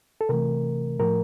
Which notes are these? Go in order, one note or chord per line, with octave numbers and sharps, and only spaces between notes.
A4
C3 E3 A3 A#4
A2 F3 A3 A#4